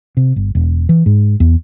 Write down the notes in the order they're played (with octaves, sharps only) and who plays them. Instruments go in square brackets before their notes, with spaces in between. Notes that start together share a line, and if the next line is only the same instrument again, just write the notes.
[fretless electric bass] C3
G1
E1
E3
G#2
E2